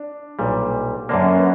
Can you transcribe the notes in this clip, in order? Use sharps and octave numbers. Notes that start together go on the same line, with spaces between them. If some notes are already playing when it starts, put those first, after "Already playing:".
Already playing: D4
B1 A#2 G3
F#2 D3 A#3 D4
C#4
B3